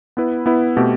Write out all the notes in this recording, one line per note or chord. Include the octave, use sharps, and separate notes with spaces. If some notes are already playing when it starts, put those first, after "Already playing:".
B3 E4 B4
B3 E4 B4
B2 A3 C4 G4